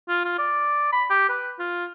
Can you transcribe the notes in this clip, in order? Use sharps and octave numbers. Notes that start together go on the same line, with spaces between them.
F4
F4
D5
B5
G4
B4
F4